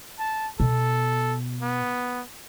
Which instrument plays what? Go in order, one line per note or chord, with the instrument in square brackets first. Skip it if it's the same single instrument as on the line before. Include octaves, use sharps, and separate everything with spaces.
[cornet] A5
[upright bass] B2 [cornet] A4
[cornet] B3